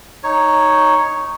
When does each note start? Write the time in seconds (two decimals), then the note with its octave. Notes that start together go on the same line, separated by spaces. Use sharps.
0.24 D#4 C#5